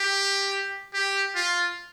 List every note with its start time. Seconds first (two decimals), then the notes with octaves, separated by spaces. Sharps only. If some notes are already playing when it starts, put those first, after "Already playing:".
Already playing: G4
0.94 G4
1.35 F4